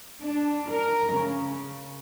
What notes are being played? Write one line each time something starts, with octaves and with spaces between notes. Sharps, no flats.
D4
A#4
C#3